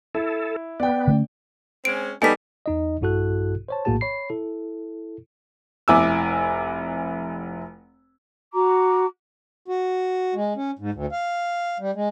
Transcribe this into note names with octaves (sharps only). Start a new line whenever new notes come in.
E4 A4
B3 D5 G5
D3 A3 C#4
G#3 C4 C#4 D7
G3 B3 D#4 A4 G#5 B6
E2 D#4 D#5
A#1 G2 E4 F#4 A4 F#6
C5 C#5 A5
A#1 A2 A#3 F#4 G#4 A5
C#5 B5 C7
E4 A4
F1 E4 G#5 D6 E6
F#4 A#5 D6
F#4
G#3
C#4
G#2
D2
F5
G3
G#3